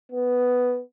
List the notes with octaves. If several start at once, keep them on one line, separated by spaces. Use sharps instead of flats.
B3